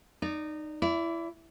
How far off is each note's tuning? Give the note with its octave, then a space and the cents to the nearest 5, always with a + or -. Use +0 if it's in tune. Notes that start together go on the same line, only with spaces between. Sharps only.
D#4 -20 D5 +0
E4 +20 D5 -20